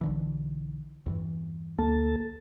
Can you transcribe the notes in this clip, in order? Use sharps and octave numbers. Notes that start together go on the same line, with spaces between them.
B1 D3 E3
E2 G2 E3
D2 A#3 A4 A5